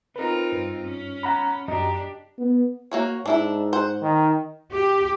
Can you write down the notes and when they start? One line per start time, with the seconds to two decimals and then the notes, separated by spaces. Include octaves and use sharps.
0.16 C4 D#4 F4 A#4 B4
0.52 G2
0.85 C#4
1.23 F#5 A#5 B5
1.68 F#2 D4 G4 D#5 A#5
2.39 B3
2.91 A#3 F#4 C#5
3.26 G#2 D4 E4 A4
3.73 C5 F#5
4.02 D#3
4.73 G4